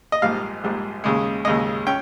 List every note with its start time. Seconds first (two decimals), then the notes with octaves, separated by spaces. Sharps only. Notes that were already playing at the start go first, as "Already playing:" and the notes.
0.12 D#5
0.22 A#1 G#2 G3 F5
0.64 A#1 G#2 G3
1.04 D#2 C#3 G#3
1.45 D#2 C#3 G#3 D#5
1.87 C#4 G5